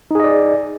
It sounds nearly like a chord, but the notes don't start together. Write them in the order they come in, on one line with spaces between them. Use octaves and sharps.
D#4 G#4 D#5 D5